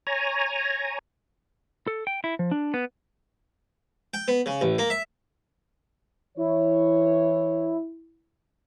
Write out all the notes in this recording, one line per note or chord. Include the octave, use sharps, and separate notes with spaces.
C#5 G#5 A#5
A4
G5
E4
F3
D4
B3
G5
B3
C#3
A1
A#3
E5
E3 E4 C#5